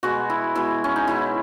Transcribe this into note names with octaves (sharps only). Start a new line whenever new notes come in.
B2 G#3 F#4
E4
B2 G#3 E4
C#4
D#4
B2 G#3 E4